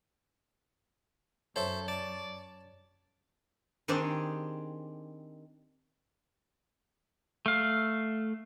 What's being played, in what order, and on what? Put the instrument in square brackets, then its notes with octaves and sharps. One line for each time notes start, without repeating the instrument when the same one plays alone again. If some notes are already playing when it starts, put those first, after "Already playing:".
[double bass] F#2 [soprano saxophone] A4 [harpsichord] C5 E5 [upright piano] C#5
[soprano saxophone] D5 [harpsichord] A5
[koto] D#3 C4 D4 G4 G#4
[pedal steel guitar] A3 F5